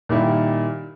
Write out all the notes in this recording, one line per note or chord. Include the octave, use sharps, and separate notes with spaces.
A#2 D#3 G3 E4